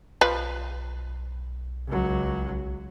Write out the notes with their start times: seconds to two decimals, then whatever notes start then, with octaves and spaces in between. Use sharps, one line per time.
0.21 B1 F3 B4
1.87 C#2 F#3